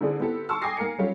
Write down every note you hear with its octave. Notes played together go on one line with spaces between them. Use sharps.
D3 C4 E4 G#4 D5
B3 C4 E4 G4 A4
A5 C6 C#6 E6
G5 G#5 D6 D#6 A#6 C7
A#3 A#4 G#5 C#7
F#3 G3 C#4 F4 G4